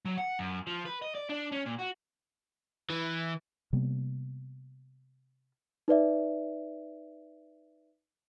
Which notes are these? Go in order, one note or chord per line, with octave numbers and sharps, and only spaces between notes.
F#3
F#5
F#2
F3
B4
D#5
D5
D4
C#4
A#2
F#4
E3
C3 G3 A#3 B3
D#4 B4 D5 E5